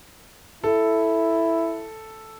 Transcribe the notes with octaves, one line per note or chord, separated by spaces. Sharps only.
E4 A4